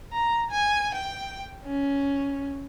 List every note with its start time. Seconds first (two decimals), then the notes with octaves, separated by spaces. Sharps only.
0.12 A#5
0.51 G#5
0.94 G5
1.65 C#4